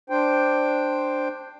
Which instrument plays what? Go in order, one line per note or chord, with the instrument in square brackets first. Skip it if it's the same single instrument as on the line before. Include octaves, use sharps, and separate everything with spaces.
[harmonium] D4 C5 G5